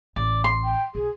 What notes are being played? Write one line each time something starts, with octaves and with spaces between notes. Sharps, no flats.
A1 D5
C6
G5
B1 G#4